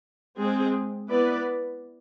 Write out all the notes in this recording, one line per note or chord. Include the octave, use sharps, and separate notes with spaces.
G#3 C4 G#4
B3 E4 B4 D5